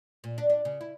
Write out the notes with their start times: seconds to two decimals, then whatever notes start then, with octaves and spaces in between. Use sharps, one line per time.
0.24 A#2
0.38 D4
0.50 D4
0.65 C#3
0.81 E4